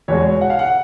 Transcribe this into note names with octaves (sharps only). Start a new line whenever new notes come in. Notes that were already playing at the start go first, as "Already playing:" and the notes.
E2 B2 G#3 C#5
F#5
F5
F#5